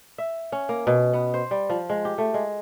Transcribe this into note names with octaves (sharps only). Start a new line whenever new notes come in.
E5
C#4
A#3
B2
B3
C5
G3
F3
G#3
G4
A3
G#3